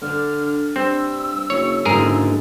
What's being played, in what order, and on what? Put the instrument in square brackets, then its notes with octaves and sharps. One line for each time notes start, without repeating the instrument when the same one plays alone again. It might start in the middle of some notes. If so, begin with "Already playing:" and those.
[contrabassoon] D3 [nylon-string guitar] D4 [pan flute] F6
[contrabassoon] G2 [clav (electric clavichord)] C4 [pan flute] E6
[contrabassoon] F#1 [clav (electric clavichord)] C#5
[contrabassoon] F#1 [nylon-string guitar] G#2 D3 [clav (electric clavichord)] G#4 A#4